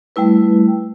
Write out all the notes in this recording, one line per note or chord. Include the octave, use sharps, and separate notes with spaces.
G3 A3 E4 B4